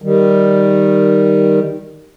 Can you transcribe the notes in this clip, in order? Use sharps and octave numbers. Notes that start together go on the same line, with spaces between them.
D#3 G3